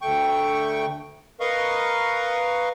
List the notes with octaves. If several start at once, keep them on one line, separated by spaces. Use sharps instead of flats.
D2 A3 G5 C#6
A#4 B4 D#5 F5 C#6